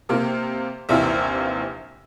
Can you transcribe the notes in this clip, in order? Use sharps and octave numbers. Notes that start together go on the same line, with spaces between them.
C3 A#3 F4
A#1 D#2 C3 E3 F4 E5